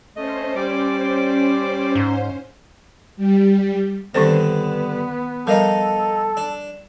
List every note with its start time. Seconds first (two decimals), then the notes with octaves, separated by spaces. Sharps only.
0.16 A3 C#4 C5 D#5
0.56 G3 D5 D6
1.95 G#2
3.17 G3
4.14 G2 D3 D#3 B3 C4 C5
5.47 F3 G3 D#4 A4 A#4 D#5 F5
6.37 D4